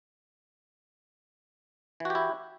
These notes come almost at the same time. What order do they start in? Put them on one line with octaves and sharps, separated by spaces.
E3 F#4 G4 E4